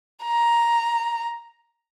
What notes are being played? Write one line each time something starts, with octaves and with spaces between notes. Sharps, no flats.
A#5